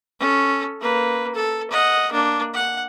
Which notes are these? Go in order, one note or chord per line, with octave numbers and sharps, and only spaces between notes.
C#4 A4
A#3 B4
A4
D#5 F#5
A#3 D4
F#5